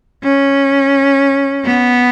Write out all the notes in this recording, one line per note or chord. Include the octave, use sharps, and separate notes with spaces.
C#4
B3